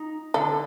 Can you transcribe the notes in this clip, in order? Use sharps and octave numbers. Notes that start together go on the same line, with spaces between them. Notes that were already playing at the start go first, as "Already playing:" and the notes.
Already playing: D#4
D3 A4